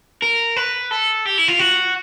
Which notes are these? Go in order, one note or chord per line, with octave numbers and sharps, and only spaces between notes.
A#4
B4
A4
G4
E4
F4
F#4